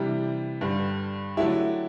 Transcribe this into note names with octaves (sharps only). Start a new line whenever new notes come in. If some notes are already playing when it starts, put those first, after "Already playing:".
Already playing: C3 E3 G3 D4 G4
G2 D3 G3
D3 F#3 A3 E4 G4